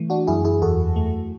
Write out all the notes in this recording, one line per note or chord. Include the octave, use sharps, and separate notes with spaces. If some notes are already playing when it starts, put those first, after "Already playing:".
Already playing: E3 A3
D4 F#4
F#2 E4 G#4
E4 G#4
E2 F#4 A4
A3